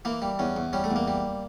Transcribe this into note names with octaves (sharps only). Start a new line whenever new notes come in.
E3 A#3
G3
E2 C#4
E2
G3 C#4
A3
E2
A#3
G3